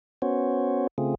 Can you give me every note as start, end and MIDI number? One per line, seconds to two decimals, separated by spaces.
0.22 0.87 59
0.22 0.87 61
0.22 0.87 66
0.22 0.87 72
0.22 0.87 73
0.98 1.15 49
0.98 1.15 57
0.98 1.15 60
0.98 1.15 65
0.98 1.15 68